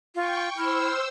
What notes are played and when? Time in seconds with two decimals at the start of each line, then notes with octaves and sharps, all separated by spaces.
0.15 F4 G5 C#6
0.57 E4 C5 E6 F6